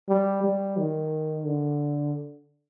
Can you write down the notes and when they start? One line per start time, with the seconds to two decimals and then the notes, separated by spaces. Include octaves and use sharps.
0.09 G3
0.44 G3
0.77 D#3
1.45 D3